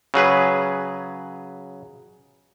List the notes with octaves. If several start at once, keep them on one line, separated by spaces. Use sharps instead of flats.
C#3 F#3 G#4 B4